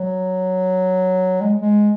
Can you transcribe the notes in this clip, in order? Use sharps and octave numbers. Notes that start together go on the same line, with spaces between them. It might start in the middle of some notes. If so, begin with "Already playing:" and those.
Already playing: F#3
G#3
G#3